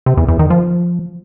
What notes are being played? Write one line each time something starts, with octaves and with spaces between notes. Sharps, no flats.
C3
E2
E2
D#3
F3